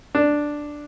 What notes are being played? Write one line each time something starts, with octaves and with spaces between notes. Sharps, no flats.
D4